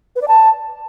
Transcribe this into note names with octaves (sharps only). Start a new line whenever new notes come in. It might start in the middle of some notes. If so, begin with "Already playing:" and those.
B4
D5
A5